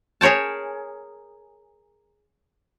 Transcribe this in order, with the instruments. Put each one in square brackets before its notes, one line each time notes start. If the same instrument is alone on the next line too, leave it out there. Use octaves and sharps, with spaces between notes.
[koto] G#4 A#4 C#5 G5 A5